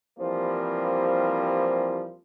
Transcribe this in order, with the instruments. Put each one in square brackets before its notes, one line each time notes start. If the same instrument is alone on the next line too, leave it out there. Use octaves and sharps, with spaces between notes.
[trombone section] C2 E3 F3 G3 A#3 C4